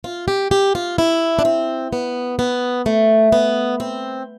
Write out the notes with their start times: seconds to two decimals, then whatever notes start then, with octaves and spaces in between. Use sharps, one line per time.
0.04 F4
0.28 G4
0.51 G4
0.75 F4
0.98 E4
1.39 D4
1.45 C4
1.93 B3
2.39 B3
2.86 A3
3.32 B3
3.80 C4